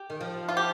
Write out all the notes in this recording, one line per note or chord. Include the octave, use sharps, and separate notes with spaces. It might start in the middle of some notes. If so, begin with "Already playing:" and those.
Already playing: G4
D#3
F3
F4
G4